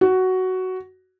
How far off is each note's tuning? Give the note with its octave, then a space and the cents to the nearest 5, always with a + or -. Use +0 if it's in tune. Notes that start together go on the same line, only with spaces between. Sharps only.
F#4 +10